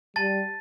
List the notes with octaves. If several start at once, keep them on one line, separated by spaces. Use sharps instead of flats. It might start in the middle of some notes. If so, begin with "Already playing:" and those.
G3 A5 A6